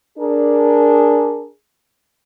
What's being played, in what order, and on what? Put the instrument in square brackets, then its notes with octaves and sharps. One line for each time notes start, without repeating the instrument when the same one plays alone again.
[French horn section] D4 G#4 A#4